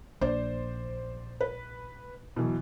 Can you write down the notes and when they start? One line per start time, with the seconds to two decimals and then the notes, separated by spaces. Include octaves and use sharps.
0.21 A#1 A#3 D4 C5 D5
1.41 B4
2.36 B2 E3 F#3